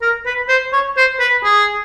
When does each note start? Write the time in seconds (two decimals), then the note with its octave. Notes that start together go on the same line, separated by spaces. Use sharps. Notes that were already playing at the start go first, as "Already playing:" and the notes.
0.02 A#4
0.26 B4
0.49 C5
0.73 C#5
0.97 C5
1.20 B4
1.44 G#4